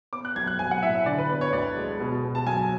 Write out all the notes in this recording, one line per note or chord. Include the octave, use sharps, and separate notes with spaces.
B3 D6
F#6
B1 G#6
F#6
B1 G#5
F#5
A2 E5
E5
D3 D5
B4
B3 B4
C#5
D2 D5
G#3
B2
B2
A5
B1 G#5